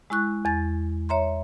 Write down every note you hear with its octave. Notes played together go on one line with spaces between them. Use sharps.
G#3 E4 C#6 F#6
E2 A6
C#5 E5 A#5 C6